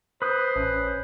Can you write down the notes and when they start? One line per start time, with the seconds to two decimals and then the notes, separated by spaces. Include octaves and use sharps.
0.22 B4 C5 D#6
0.56 A1 C#4